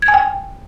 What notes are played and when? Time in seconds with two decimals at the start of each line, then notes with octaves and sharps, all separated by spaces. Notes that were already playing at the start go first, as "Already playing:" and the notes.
0.02 G#6
0.08 G#5
0.14 G5